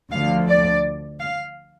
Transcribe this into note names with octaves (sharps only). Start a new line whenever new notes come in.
D2 D3 F3 F5
D5
F5